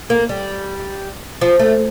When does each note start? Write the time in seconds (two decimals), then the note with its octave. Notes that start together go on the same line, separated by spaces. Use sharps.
0.10 A#3
0.29 G3
1.41 F3
1.59 A3